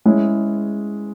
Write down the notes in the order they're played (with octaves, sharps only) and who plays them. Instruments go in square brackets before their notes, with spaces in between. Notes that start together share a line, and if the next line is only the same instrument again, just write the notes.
[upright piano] G#3 C#4 E4 G#4